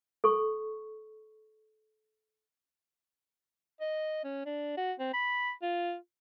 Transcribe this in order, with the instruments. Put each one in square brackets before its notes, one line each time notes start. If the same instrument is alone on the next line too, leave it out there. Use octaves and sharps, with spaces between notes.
[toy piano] A4 C#6
[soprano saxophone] D#5
C#4
D4
F#4
C4
B5
F4